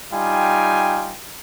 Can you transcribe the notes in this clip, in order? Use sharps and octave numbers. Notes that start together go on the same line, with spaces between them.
G3 D#4 F4 G5 G#5